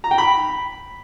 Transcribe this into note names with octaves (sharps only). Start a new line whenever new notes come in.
A#5
G5
B5